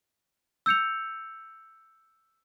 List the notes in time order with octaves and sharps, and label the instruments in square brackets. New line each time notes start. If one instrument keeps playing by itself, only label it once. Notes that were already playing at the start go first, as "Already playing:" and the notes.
[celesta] E6 G6 C#7 F7